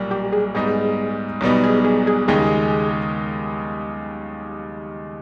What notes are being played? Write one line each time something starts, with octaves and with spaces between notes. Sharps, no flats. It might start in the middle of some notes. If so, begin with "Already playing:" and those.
Already playing: B1 A#2 G3
G4
G#4
G#2 G3 B3 D#4 G#4
B1 B2 G3 B3 D#4
G#4
G#4
G#4
D#2 C#3 G#3 D#4 G4 G#4